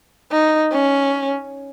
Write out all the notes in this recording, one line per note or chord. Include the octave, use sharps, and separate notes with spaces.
D#4
C#4